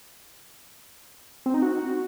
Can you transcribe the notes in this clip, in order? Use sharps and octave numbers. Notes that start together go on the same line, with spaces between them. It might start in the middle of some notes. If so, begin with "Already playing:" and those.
C4
D#4
F#4